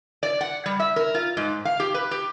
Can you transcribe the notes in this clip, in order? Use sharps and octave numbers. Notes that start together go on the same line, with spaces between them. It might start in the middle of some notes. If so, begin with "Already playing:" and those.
D5
F#5
G3
E5
A#4
F4
G#2
F5
G4
B4
G4